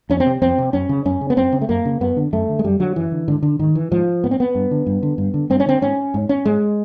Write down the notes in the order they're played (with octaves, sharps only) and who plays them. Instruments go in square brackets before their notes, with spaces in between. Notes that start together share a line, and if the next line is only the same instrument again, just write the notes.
[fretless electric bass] F2 C#4
C4
C3
F2 C4
C3
F#2 C#4
C#3
F#2 C#4
C#3
B3
F#2 C4
C#3
A3
F#2 A#3
C#3
F#2 B3
D3
F#2 A3
D3
G#3
F#2 G3
D3 F#3
F#2 E3
D3
G#2 D3
D3
G#2 D#3
E3
G#2 F3
G#2 B3
C4
B3
G2
D3
G2
D3
G2
D3
G2 C4
C#4
D3 C4
G#2 C#4
G#2
C#4
G#2 G#3